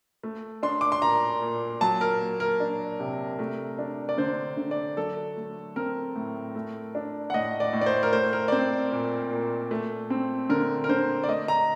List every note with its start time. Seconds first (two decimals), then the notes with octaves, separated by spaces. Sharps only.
0.23 A3
0.63 D4 C6
0.81 D6
0.92 C6
1.02 A#2 A#5
1.42 A#2
1.81 F#3 A5
2.01 A#4
2.20 A#3
2.40 A#4
2.60 D4
3.00 C3
3.39 A3
3.79 D4
4.09 D5
4.18 D3 C5
4.57 D3
4.71 D5
4.97 F#3 A4
5.37 A3
5.76 C4 A#4
6.16 A2
6.55 A3
6.95 D4
7.30 F#5
7.33 A2 D#5
7.60 D5
7.73 A2
7.81 D5
7.86 C5
8.03 A#4
8.13 A3 C5
8.33 A#4
8.48 D5
8.52 C4 C5
8.92 A#2
9.31 A#2
9.71 A3
10.10 C4
10.49 D3 A#4
10.84 A#4
10.89 D3 C5
11.24 D5
11.28 A3 D#5
11.48 A#5